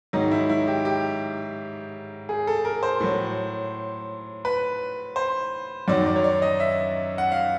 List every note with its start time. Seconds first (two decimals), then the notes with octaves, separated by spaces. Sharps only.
0.13 G#2 D#3 F#3 D#4
0.31 E4
0.49 E4
0.68 G4
0.85 G4
2.29 G#4
2.47 A4
2.65 A#4
2.83 C5
3.00 A2 F#3
4.45 B4
5.16 C5
5.88 F#2 D#3 F#3 D5
6.06 D5
6.16 C#5
6.24 D5
6.42 D#5
6.60 E5
7.18 F#5
7.32 F5